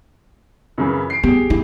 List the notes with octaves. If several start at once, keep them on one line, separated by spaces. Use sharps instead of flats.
F#2 C#3 E3
C7 D7
B3 G4 G#4
E4